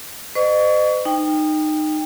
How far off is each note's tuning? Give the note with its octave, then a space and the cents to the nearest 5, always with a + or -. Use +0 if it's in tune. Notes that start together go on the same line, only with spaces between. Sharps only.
C5 -40 D#5 -40 C#6 +30
D#4 -20 G5 +20